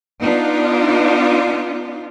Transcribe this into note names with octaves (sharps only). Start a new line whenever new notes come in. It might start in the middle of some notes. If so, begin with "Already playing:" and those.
B3 D4 D#4 F4